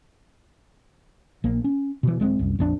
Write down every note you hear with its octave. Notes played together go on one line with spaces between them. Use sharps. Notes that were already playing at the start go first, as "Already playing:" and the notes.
A#1 A#3
C#4
B2 E3
D1 G#3 A#3 C4
C2 F#2
A#1 F2 D4